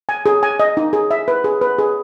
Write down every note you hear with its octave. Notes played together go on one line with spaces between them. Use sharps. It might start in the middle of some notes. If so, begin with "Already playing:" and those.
G#5
G#4
G#5
D#5
D#4
G#4
E5
B4
G#4
B4
G#4